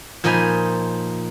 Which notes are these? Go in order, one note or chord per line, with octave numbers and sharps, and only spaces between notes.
A#2 F3 D#4 D#5 G#5 B5